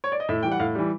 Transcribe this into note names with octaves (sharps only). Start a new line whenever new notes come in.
C#5
D5
D#5
A2 E5
E3 G3 G5
F#5
A2 F5
E3 G3